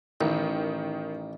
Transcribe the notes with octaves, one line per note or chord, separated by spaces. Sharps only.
A1 D#3